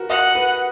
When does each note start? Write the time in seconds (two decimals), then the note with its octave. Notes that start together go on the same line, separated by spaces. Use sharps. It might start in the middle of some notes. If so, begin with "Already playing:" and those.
Already playing: F#4 A#4 B4
0.10 D#5 F#5
0.35 B4